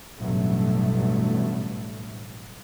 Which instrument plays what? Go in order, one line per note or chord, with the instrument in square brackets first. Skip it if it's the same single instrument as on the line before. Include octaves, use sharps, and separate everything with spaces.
[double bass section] A1 G2 B2 F#3 A3